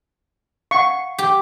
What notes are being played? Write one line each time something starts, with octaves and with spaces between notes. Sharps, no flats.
F5 F#5 C#6
G4